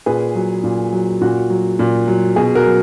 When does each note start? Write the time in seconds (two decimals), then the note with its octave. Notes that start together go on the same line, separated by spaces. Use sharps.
0.06 A#2 G#4 B4
0.35 F#3
0.64 A#2
0.93 F#3
1.21 A#2 F#4
1.50 F#3
1.79 A#2
2.08 F#3
2.36 B2 G#4
2.55 F#4 A#4
2.66 F#3